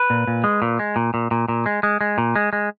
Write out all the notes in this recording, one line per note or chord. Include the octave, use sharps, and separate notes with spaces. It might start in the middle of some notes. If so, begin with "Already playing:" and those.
Already playing: B4
A#2
A#2
G#3
A#2
G#3
A#2
A#2
A#2
A#2
G#3
G#3
G#3
A#2
G#3
G#3